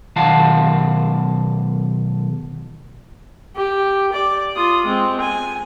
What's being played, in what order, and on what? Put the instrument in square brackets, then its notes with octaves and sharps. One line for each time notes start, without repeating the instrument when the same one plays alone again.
[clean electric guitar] B1 D#3 F5 F#5 A5
[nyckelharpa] G4
D5
F4 D#6
G#3 C4
G#5